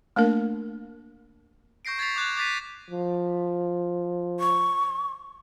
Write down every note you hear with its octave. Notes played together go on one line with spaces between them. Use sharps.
A3 A#3 D4 A#4
C#6 G6 A#6 C7 D7
C#6 G#6 A6 B6 C7 F7
D6 F#6 G#6
D6 A6 B6 D#7
F3
C#6